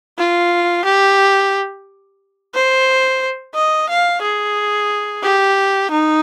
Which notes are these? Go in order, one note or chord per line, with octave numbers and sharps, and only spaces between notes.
F4
G4
C5
D#5
F5
G#4
G4
D#4